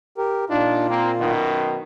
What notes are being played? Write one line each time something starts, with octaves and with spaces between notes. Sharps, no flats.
G4 A#4
A#2 D4 D#4 F4
A#3 C4
F#2 B2 D#3